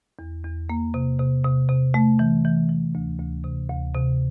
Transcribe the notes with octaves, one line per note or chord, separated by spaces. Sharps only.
E2
E2
A#3
C3
C3
C3
C3
A3
E3
E3
E3
D2
D2
C3
D2
C3